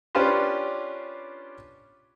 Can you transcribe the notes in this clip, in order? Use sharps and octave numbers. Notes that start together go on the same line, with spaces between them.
C#4 D4 F4 G4 B4 C5